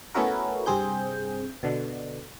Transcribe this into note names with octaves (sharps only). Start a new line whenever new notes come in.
A3 B3 C#4 E4 F#4 A#4
G2 C3 C4 G#4 G6
B2 D3